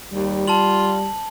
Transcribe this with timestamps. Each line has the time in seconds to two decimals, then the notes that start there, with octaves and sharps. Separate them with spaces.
0.13 D#2 G3
0.48 F4 A5 F#7